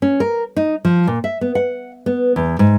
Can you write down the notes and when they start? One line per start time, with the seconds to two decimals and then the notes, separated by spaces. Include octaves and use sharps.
0.02 C#4
0.20 A#4
0.56 D#4
0.85 F3
1.07 A#2
1.24 E5
1.41 B3
1.55 F#5
2.06 B3
2.36 E2
2.59 G#2